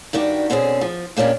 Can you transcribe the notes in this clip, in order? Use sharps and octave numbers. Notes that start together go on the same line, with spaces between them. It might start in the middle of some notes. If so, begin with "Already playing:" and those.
G2 D#3 D4 F#4 G4
B2 D3 C4 C#4 G#4
F3
A#2 A#3 C#4 D4 G4